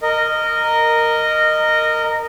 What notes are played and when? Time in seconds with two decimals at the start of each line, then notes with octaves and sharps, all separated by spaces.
0.02 A#4 D#5